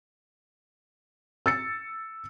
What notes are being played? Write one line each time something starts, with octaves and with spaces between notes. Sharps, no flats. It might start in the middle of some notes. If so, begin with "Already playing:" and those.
E6 A6 C#7